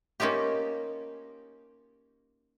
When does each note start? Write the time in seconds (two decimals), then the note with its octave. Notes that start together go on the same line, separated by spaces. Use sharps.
0.20 A#3 C#4 D#4 F4 G4